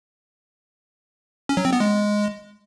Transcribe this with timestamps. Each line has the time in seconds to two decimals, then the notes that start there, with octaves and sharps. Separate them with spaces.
1.49 C#4
1.57 F#3
1.65 C4
1.73 B3
1.80 G#3